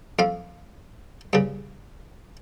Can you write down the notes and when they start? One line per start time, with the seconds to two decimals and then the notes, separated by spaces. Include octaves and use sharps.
0.19 F2 F5
1.33 G2 C#3